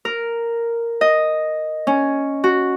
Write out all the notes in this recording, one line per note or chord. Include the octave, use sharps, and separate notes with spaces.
A#4
D#5
C#4
F#4